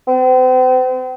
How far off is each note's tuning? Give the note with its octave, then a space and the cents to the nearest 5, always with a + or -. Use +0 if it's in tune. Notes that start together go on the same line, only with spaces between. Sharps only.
C4 -40